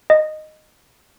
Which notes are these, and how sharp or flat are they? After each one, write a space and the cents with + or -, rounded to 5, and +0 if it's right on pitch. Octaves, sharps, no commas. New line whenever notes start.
D#5 -10